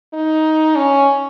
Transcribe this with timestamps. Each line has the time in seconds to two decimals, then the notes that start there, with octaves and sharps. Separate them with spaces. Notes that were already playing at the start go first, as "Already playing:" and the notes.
0.14 D#4
0.76 C#4